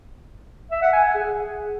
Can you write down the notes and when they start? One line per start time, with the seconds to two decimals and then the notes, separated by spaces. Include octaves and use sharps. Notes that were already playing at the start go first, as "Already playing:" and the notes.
0.71 E5
0.82 F#5
0.93 G#5
1.04 F#5
1.14 G#4